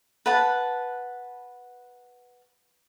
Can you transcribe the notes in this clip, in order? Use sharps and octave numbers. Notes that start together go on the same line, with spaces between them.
B4 F#5 A5